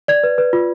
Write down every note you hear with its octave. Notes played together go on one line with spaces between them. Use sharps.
D5 G#6
B4
B4
F4